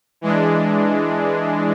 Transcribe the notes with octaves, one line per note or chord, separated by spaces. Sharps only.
E3 G#3 D4